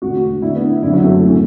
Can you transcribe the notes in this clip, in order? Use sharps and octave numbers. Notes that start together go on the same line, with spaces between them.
E1 D2 D3 F#4
D2 D3 E4
B3
E4
F#1 F#2 D3 E4
F#3
A3
A2 E3